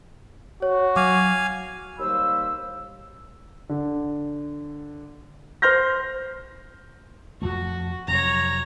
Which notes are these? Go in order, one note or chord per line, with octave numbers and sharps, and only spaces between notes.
F#4 C#5
F#3 F5 G#5 D6
D#2 G3 A#3 C5 B5 E6
D3
C5 C6 F6 G6 A#6
F2 F3 A3 F#4
F2 C3 F#3 C#5 A#5